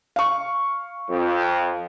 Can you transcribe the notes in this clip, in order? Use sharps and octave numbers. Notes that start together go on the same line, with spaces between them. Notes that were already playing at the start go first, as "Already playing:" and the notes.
F5 C#6
F2